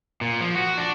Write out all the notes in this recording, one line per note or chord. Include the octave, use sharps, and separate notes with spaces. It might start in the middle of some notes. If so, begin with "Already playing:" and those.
A#2
F3
F#4
D4